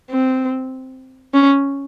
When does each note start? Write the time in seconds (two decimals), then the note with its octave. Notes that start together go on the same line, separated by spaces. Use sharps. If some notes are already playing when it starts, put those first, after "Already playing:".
0.10 C4
1.34 C#4